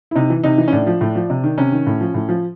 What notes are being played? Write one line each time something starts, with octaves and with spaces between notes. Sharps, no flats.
E4
C3 D#4
E3
C3 D#4
E3
C#4
A2 D4
F3
A2
F3
C3
D#3
C3 C#4
D#3
A2
F3
A2
F3